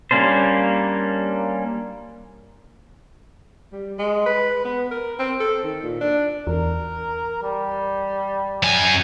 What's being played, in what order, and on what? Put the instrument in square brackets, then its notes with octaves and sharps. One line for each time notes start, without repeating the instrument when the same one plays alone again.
[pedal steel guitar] G3 A#3 C#4 D4 C5
[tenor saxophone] G3
G#3
B4
B3
A#4
C4
A4
D#3
A#2
D4
[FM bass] E2 [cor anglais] A#4
[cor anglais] G3
[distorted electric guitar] F#2 G#5